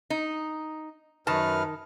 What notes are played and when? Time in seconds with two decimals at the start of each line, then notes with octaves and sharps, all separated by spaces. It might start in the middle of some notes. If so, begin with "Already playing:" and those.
0.10 D#4
1.27 F#2 D#3 B4 A5 F6